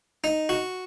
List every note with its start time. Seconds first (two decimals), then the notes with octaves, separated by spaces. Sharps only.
0.24 D#4
0.49 F#4